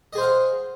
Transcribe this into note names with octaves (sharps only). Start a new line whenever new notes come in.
G#4 C5 D#5 F5 F#5